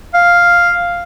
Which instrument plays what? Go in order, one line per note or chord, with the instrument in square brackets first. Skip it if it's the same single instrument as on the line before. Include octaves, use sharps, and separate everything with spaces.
[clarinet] F5